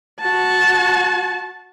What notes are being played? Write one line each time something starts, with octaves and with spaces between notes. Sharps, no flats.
F#4 A5